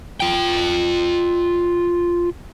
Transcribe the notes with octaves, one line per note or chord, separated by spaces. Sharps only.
F4 G5